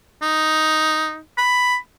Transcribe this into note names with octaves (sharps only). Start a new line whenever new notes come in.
D#4
B5